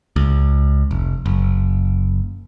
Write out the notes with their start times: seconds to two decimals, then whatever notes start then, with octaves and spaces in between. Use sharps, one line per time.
0.16 C#2
0.91 F1
1.26 F#1